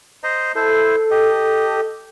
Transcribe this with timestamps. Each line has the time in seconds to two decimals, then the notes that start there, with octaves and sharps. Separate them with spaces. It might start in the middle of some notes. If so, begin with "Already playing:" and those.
0.24 C5 D#5 A#5
0.55 E4 A4 C5
1.11 G4 D#5